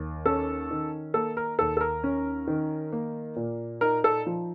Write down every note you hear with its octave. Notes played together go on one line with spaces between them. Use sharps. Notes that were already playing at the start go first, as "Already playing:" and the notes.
Already playing: D#2
C#4 A4
D#3
A#3 A4
A#4
D#2 A4
A4
A#4
C#4
D#3
A#3
A#2
D#4 A#4
A4
F3